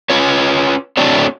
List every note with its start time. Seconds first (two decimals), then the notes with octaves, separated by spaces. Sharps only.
0.10 C#4 F4 B4 C#5
0.97 A3 C4 D4 F#4 C#5